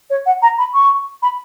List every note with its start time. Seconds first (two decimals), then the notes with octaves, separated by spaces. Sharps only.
0.10 C#5
0.26 F#5
0.42 A#5
0.58 B5
0.73 C#6
1.22 B5